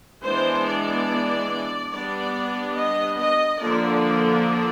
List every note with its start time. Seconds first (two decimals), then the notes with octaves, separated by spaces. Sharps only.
0.23 E3 G#3 B3 D4 C5
0.65 D5
1.92 G3 B3 D4 D5
2.76 D#5
3.18 D#5
3.60 D3 F3 A#3 D4 D5